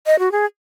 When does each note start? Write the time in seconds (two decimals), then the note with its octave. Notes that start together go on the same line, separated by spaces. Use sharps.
0.06 D#5
0.19 F#4
0.32 G#4